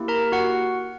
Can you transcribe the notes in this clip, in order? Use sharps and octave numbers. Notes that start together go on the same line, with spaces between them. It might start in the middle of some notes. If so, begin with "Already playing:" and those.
Already playing: A#3 E4 G4
A#4 A#5
F#4 F#5